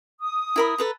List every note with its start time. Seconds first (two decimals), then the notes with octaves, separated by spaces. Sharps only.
0.20 D#6
0.56 E4 A#4 B5
0.78 A4 B4 A#5